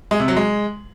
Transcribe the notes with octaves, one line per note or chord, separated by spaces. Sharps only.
G#3
C3
F#3
G#3